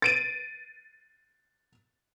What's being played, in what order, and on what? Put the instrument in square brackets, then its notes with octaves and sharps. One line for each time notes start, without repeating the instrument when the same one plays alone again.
[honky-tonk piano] A6 D7 D#7